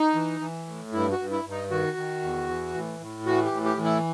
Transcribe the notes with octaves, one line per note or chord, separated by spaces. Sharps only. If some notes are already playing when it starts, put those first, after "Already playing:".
Already playing: D#4
E3
E3
A2
G2 E4
F#4
G2
E4
G2
D#4
D#3 F#4
D#3
E2
E3
A2
A2
E3 F#4
G4
A2
G4
E3
E4